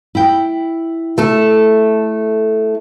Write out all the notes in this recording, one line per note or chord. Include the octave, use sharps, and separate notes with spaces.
E4 G5
A3 A4